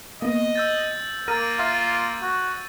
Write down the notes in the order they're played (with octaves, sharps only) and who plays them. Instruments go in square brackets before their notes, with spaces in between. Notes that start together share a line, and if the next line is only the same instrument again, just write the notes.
[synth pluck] A#3 B3 [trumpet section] D#5
[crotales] E6 G6 A6
[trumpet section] A#3 [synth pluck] A#4 [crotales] A6 D#7
[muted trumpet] F4 [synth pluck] E5
[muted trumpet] F#4